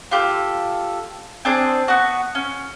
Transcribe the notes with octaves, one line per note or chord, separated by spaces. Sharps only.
F4 G4 A4
C4 D4 G#4
B3 F#4
C#4